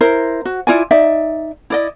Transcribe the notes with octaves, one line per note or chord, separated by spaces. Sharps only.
E4 A#4 C5
F#4
E4 F4 D5 G#5
D#4 D5 E5
E4 D5 D#5